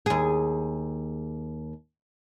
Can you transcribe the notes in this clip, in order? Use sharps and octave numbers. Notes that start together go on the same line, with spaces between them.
D#2 G#4